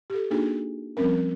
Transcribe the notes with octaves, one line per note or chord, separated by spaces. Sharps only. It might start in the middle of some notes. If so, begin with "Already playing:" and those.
G4 A4
A#3 D4 D#4 F#4 G#4
F3 G3 C4 C#4 A#4